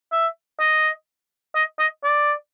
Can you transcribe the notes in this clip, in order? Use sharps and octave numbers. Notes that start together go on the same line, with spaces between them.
E5
D#5
D#5
D#5
D5